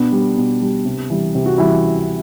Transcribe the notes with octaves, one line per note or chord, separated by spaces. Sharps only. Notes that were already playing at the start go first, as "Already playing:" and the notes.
Already playing: B2 B3 D4
G3
B2
G3
C3
E3 G3
C3
F#4
E3 G3 E4